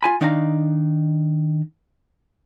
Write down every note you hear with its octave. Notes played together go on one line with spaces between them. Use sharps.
F4 G#5 B5
D#3 D4 D#4 F5 F#5 A#5